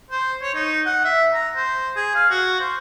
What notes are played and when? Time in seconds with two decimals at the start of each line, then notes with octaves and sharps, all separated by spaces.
0.10 C5
0.42 C#5
0.55 D#4
0.86 F#5
1.05 E5
1.33 A#5
1.56 C5
1.96 G#4
2.15 F5
2.30 F#4
2.60 C5